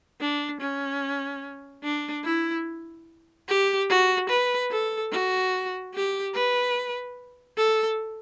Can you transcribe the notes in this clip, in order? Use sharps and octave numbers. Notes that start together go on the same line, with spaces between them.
D4
C#4
D4
E4
G4
F#4
B4
A4
F#4
G4
B4
A4